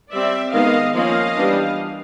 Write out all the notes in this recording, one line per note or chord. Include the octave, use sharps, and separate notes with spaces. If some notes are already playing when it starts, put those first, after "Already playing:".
G3 C4 D5 E5
D#3 G#3 B3 D#5 F5
F3 A#3 C#4 D#5 F5
E3 G3 B3 D4